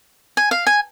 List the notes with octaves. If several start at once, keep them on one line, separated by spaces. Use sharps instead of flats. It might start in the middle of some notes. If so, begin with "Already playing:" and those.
G#5
F5
G#5